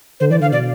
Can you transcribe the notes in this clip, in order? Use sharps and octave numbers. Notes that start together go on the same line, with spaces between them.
D3 C5
E3 D5
D3 F5
B2 D5